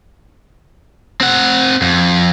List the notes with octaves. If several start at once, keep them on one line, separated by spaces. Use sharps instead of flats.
C4 F#5
F2